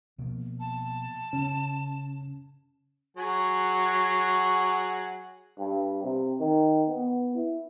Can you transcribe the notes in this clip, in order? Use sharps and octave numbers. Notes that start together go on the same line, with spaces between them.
B2 F3 A#3
A5
C#3 C#4
F#3 G#4 F#5
G2
C3
D#3
B3
E4